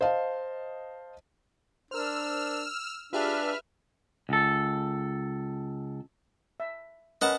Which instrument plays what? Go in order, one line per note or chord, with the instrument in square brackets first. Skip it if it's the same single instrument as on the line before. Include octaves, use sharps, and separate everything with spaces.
[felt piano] C5 D#5 F5 A5
[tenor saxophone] D4 [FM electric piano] A#4 C5 [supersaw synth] E6 F6
[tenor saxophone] D4 [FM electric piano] F4 G4 G#4 [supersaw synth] B4 E5 F6
[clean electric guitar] C#2 A4
[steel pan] E5
[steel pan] C#4 A#4 B4 [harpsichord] D#5 F#5 A5